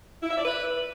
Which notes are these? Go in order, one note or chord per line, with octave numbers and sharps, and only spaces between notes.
E4
E5
D5
B4